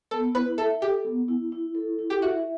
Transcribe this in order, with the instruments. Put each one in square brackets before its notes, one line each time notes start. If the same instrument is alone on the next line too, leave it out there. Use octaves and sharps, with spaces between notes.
[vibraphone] B3 [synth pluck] A4
[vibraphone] E4 [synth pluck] B4
[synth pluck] A4 [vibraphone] E5
[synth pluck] G4 [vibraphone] A4
[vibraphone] B3
E4
E4
A4
E4
[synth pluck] G4
[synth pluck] F#4 [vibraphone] E5